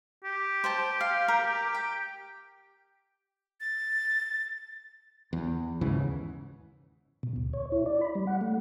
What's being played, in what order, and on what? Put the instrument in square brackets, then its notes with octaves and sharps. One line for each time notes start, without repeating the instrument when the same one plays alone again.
[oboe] G4
[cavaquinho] C5 G5 A5
F5
A#4
G5
[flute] A6
[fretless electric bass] E2
D#2 G#2 C#3 E3
[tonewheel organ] B2
D2
C#5
E4
D5
B5
G3
F#5
A3